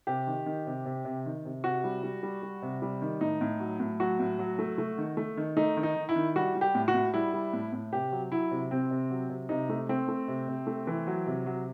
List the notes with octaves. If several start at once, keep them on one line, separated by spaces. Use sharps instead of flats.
C3 G4
D#3
D#3
C3
C3
C3
D#3
C3
C3 F#4
G3
G3
G3
G3
C3
G3
D#3
A2 D#4
A2
F#3
A2
F#3 F#4
A2
F#3
A3
A3
D#3
A3
D#3
A3 D#4
D#3
D#4
D#3
E4
D#3
G3 F#4
G3
G4
A2
F#4
A2
G3 E4
G3
A2
A2
C3 G4
F#3
F#3 E4
C3
C3 C4
C3
F#3
C3
C3 D#4
A3
A3 C4
A3
C3
C3
A3
E3
F#3
C3
F#3